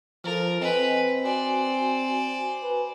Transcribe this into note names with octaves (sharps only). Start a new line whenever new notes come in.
F3 F4 A4 A#4
C4 B4 D#5 G#5
F#4 C5 D5 G#5
B4